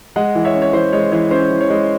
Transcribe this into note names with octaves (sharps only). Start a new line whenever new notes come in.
G#3 D#5 F#5
E3
C#5 E5
C#4
C#5
E3 C5
G#3 C#5
E3 C#5
C#4 C5
E3
C#5
G#3